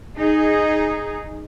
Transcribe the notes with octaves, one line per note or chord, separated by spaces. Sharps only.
D#4 G#4